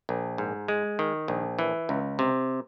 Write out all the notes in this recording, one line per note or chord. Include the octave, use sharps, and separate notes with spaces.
A#1
G#2
G#3
D#3
A#1
E3
C#2
C3